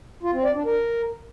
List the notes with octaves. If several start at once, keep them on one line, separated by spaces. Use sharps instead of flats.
F4
C4
D5
D4
A#4